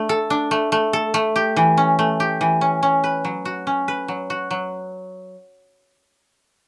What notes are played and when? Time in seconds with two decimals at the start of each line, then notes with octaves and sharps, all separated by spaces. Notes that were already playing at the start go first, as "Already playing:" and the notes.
Already playing: A3 D4
0.09 A4
0.30 D4
0.51 A3
0.72 A3
0.93 A4
1.14 A3
1.36 G4
1.56 E3
1.77 C#4
1.99 A3
2.20 G4
2.41 E3
2.61 C#4
2.83 C#4
3.04 B4
3.25 F#3
3.45 F#4
3.67 C#4
3.88 B4
4.08 F#3
4.30 F#4
4.51 F#3